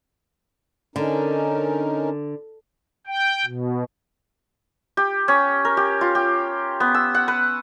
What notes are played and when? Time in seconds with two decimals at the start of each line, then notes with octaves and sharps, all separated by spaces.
0.96 D3 C#4 D#4 A#4
3.07 G5
3.45 B2
4.97 G4
5.28 C#4
5.65 A#4
5.77 G4
6.01 F4
6.15 G4
6.80 B3
6.94 E6
7.15 F#5
7.28 B4